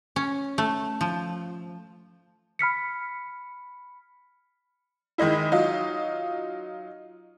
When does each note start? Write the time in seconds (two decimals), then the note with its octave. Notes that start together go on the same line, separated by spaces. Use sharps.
0.16 C#4
0.58 A3
1.01 F3
2.59 B5 F6 B6 C#7
5.18 D#3 G#3 D#4 E4
5.52 F#3 D#4 F4